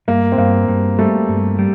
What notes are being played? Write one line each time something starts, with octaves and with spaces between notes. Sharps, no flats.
G2 A#3
C4
G2 A#3
G2
G3 A3
G2
G3